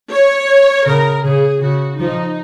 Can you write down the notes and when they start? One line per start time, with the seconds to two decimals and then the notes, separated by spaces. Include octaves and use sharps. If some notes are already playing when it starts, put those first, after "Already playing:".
0.11 C#5
0.86 C#3 A#4
1.24 C#3 G#4
1.62 C#3 F#4
1.99 F3 D#4